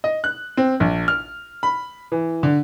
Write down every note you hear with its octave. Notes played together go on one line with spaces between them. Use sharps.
D#5
F#6
C4
A#1
F6
B5
E3
D3